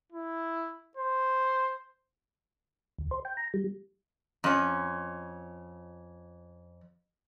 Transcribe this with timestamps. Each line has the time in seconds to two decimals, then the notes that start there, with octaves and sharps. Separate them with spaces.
0.12 E4
0.97 C5
2.98 D2
3.11 C5
3.25 G5
3.37 A#5
3.54 G3
4.44 F2 C#4